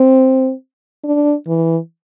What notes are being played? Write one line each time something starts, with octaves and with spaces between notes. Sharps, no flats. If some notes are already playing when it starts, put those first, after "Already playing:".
Already playing: C4
D4
E3